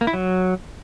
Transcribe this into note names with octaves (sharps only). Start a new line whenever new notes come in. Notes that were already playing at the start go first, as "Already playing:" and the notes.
A#3
E4
F#3